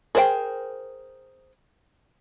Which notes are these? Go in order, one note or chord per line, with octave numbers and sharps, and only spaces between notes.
G#4 A#4 C5 F5 G5